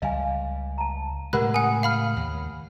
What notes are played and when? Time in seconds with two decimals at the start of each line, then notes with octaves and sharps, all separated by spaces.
0.02 C#2 G3 D#5 F5 G#5
0.78 A5 A#5
1.33 A2 C#3 G#3 G4 A#4 F#5 B5 F#6
1.54 F#5 G#5 D#6
1.83 F5 B5 F6
2.16 D#2